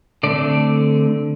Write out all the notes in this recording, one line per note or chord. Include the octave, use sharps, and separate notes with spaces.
D3 A3 C4 D5